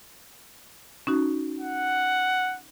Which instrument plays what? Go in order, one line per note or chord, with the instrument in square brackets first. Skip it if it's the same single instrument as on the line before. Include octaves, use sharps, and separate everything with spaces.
[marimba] C#4 D#4 F#4
[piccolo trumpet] F#5